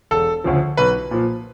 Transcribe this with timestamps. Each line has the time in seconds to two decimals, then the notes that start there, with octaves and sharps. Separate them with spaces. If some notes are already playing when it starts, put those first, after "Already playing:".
0.11 E1 A4
0.44 D2 C#3 F3
0.77 B1 B4
1.11 A#2 F3